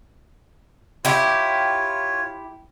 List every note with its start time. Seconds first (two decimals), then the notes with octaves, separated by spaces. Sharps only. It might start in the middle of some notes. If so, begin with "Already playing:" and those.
1.05 E4 F4 G4 C#5